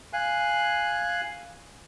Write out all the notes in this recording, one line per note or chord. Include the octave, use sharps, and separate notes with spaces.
F5 G#5 F#6